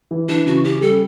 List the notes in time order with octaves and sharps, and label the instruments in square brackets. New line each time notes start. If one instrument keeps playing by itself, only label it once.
[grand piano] E3
[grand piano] E3 [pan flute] D4
[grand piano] C#3 [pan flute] F#4
[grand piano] C#4 [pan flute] G4
[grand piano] G3 [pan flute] A4